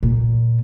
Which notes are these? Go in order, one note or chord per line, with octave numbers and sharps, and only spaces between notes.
A#2